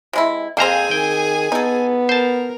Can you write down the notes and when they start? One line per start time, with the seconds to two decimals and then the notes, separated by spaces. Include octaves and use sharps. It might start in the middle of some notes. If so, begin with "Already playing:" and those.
0.13 C3 G#3 E4
0.57 F2 A#3 C4 G#4 C5 G#5 A#5
0.91 D#3 G5
1.52 B3 D#4 A4
2.09 A#4 C5 A5